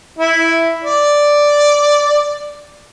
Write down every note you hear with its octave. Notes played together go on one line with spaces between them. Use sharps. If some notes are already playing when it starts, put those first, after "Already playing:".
E4
D5